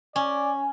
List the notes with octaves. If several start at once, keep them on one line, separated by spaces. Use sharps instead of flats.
C#4 D5